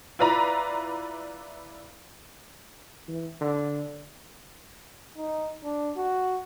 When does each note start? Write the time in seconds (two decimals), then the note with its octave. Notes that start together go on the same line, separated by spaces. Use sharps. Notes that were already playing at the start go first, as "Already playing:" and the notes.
0.19 E4 F4 B4 D5 A#5 B5
3.08 E3
3.41 D3
5.17 D#4
5.64 D4
5.97 F#4